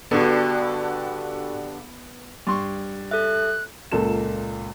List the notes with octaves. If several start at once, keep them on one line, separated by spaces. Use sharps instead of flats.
G2 D3 B3 F#4 A4
G2 C6 C#6
A4 E5 F#6
C#2 A#2 A4 A#4 E7